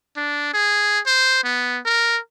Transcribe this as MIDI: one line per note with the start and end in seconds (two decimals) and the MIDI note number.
0.17 0.54 62
0.54 1.00 68
1.07 1.41 72
1.44 1.79 59
1.86 2.18 70